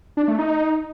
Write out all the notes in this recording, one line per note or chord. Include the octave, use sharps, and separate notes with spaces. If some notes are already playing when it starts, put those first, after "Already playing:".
D4
A3
D#4